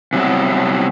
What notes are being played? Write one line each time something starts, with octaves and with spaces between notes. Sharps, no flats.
C3 F#3 G3 B3 E4